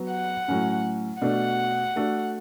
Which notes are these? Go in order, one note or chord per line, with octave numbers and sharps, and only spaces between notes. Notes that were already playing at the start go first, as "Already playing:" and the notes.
Already playing: F#3 B3 F#4 B4
F#5
A2 F#3 A3 C#4
B2 A3 D4 F#4 F#5
A3 D4 F#4 A4